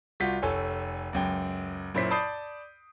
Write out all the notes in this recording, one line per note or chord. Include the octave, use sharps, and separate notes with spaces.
C2 F4 F#4 G6 B6
F1 A4 C#5 G#5
C#2 F#2 G5
F#2 A#2 E4 C5 C#5 B6
D5 A5 B5 D#6 G6 C7